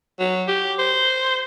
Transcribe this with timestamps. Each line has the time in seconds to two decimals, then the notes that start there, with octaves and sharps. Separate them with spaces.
0.19 F#3
0.48 G4
0.79 C5